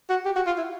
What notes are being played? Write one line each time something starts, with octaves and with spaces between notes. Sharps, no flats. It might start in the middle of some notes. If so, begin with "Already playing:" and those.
F#4
G4
F#4
F4
E4